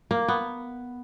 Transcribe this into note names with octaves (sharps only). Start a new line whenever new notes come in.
A#3
B3